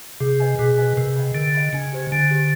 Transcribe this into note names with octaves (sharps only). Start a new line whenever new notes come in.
C3 G#4
B4 D#5 G#5
B2 G#4
B4 D#5 G#5
C3 A#4
D#5 G5 B5
D3 A#4
D#5 G5 B5
C#3 D4
G4 C5
D3 D4
G4 C5